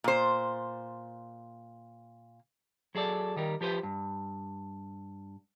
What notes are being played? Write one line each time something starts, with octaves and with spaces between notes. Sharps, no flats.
A#2 C5
F#3 G#4 A4 D5
D#3 G3 A#4
F3 G4 B4 C5
G2